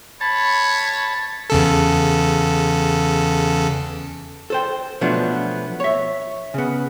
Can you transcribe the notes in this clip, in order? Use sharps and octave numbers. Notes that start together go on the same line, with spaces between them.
C#5 A5 B5
E2 C#3 A4
A4 C5 G5
B2 F3 F#3 A3 B3 D4
C#5 E5
C#3 B3